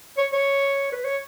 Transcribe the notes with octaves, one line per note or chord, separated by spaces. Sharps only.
C#5
C#5
B4
C#5